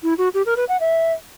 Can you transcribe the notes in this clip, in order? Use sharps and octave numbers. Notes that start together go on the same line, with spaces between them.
E4
F#4
G4
A#4
B4
F#5
E5